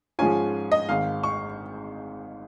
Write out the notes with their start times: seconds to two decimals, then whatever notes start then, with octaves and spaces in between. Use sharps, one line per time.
0.19 G#2 F3 G#3 C#4 F4 G#5
0.72 D#5
0.88 G#1 G#2 D#3 F5
1.24 C#6